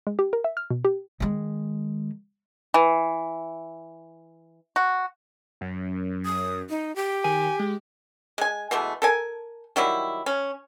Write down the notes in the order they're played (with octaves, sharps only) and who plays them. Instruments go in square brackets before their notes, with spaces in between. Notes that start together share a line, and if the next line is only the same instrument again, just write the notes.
[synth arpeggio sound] G#3
G4
A#4
E5
F6
B2
G4
[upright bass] D#3 G#3
[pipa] E3
F#4
[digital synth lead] F#2
[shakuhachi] D#6
D#4
G4
[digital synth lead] D#3 [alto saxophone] G#5
[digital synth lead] G#3
[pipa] G#3 G#5
B2 E3 G#3 A3
A4 A#4 G#5
D#3 F#3 G3 E4
C#4